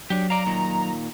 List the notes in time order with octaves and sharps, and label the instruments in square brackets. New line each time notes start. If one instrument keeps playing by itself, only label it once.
[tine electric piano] F#3 [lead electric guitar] D4 G4
[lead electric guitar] D5 F5 [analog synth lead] A#5
[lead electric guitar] A#2 D#3